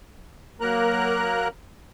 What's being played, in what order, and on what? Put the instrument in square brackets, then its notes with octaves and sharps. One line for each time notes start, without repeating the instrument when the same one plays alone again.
[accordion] F#3 A#3 A#4 A#5 F#6